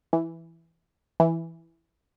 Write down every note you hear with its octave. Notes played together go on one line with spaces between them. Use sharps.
E3
E3